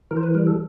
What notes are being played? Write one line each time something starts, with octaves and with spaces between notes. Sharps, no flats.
E3 A#4
C5
B4
G3 A#4
A4